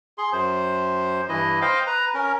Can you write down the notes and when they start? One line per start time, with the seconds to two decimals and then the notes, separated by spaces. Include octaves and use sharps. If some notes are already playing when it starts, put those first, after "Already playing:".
0.18 G#4 C6
0.33 F#2 C5
1.29 G2 E3 E4 D#5
1.62 C5 D#5 F5 G5
1.87 B4 A#5
2.14 C#4 A#4